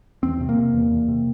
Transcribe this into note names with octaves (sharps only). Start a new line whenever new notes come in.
E2 C4
C3
A#3
C3
E2
E2
C3